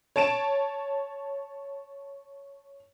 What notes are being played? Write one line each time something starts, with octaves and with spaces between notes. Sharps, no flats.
C#5 A5 D7 E7